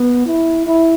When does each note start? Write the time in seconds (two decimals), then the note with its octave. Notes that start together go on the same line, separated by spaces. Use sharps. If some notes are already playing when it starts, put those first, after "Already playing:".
Already playing: B3
0.26 E4
0.66 E4